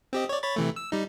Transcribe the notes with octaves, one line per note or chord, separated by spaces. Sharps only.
C4 G4 D#5
C#5 D5
C#5 B5 A6
C3 E3 A3
E6
G3 D#4